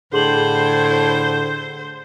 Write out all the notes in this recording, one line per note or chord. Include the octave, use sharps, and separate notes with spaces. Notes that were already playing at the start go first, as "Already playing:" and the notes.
A2 D3 G#4 C5 C6 F#7